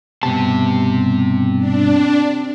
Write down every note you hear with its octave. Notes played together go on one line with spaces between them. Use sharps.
G2 B2 C4 G4 A5
D4